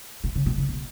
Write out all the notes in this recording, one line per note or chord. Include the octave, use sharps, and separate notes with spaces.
B2
C#3
B2
C#3
B2